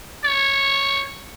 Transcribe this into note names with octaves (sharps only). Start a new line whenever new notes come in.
C#5